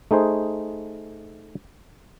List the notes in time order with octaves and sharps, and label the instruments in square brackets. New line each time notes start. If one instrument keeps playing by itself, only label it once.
[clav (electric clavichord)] A3 D#4 G#4 C5